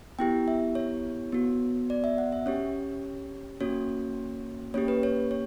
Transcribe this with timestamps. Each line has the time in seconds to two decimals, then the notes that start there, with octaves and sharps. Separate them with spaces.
0.19 B3 E4 G4 G5
0.48 E5
0.75 C#5
1.32 B3 F#4
1.90 D5
2.04 E5
2.18 F#5
2.32 E5
2.46 C#4 G4 C#5
3.61 A#3 C#4 F#4 C#5
4.74 A#3 C#4 G4 C#5
4.88 B4
5.03 C#5
5.31 C#5